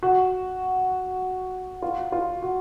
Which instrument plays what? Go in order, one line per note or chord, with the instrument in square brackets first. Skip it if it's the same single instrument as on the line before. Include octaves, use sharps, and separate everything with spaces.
[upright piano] F#4
F4
F4
F#4